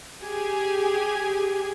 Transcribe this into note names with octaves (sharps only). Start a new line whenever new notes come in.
G4 G#4 G#5